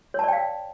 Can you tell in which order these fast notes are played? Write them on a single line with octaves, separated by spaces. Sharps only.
C#5 A5 D5 G5 F5